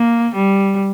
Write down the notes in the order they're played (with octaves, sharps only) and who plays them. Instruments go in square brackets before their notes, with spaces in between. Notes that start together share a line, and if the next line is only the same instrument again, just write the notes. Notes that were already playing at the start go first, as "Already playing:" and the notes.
Already playing: [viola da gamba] A#3
G3